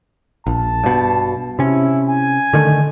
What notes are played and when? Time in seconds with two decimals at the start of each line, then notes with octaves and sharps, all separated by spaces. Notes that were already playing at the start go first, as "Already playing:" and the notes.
0.47 A#1 A5
0.84 G2 B2
1.59 C3 C#4 E4
2.07 G#5
2.53 D3 D#3 A3